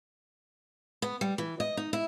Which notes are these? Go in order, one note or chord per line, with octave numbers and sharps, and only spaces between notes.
B3
G3
E3
D#5
D#4
E4